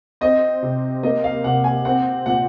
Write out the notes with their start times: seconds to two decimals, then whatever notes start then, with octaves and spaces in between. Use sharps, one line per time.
0.21 C4 D#5
0.62 C3
1.03 A#3 D#5
1.24 F5
1.44 C3 F#5
1.64 G#5
1.85 C4 F#5
2.26 A#2 F#5